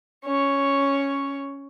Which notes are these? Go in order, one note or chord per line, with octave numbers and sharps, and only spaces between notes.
C#4 C#5